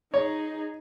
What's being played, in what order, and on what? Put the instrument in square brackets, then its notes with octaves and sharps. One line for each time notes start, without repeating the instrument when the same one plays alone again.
[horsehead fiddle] D#4 G#4 [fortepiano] C#5